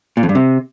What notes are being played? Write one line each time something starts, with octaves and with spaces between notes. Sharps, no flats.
A#2
F2
G2
C3